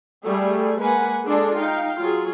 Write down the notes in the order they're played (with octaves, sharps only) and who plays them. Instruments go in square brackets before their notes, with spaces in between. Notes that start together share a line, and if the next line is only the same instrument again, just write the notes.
[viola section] G3 A3 G#4
G#3 A#3 B4 F#5 G#5
G#3 D4 F4 G#4 A4
D#4 F5 G5
F#3 F4 G#4